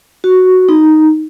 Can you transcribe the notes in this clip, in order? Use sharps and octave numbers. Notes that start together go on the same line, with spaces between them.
F#4
D#4